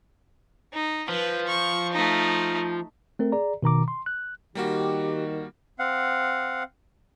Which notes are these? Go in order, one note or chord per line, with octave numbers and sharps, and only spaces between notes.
D#4
F3 B4
C#6
A3 D#4
A3 C4 A#4
G#4 D5 A#5
B2 D#3 A#5 D6
C6
F#6
D#3 G3 A#3 F#4 G4
C4 F5 F#5